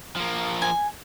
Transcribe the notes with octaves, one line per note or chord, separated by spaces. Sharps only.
F3 A#3
G#5